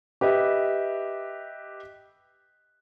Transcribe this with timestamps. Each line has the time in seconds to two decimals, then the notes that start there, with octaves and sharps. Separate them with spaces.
0.21 G4 B4 D#5 E5